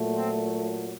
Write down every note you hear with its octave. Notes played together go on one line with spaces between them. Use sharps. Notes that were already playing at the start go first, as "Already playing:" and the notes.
Already playing: A#2 F#3 A3
C4